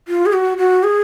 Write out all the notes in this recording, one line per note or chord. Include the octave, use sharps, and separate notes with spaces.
F4
G#4
F#4
F#4
G#4